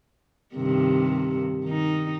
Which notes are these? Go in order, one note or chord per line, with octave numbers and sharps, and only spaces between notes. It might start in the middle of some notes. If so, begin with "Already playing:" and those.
G2 C3 D#3
D#3 D#4